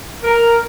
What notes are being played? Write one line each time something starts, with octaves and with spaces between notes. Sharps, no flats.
A#4